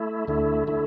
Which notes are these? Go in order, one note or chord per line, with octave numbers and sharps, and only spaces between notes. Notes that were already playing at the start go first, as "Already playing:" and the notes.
Already playing: A3 E4
D2 D3 A3 E4
D3 A3 E4